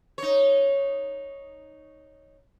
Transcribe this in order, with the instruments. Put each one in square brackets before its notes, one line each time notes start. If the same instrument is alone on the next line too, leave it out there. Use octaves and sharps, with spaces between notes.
[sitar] D#4 C#5